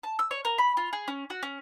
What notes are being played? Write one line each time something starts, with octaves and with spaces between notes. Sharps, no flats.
A5
E6
C#5
A#4
B5
F4
G#4
C#4
F#4
C#4